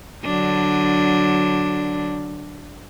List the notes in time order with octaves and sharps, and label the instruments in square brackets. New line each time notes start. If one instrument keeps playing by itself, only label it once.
[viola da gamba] D3 F#3 D4